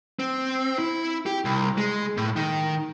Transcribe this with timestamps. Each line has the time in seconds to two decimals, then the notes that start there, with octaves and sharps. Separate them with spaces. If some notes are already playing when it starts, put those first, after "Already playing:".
0.19 C4
0.79 E4
1.26 G4
1.45 C2
1.78 G#3
2.17 A2
2.36 D#3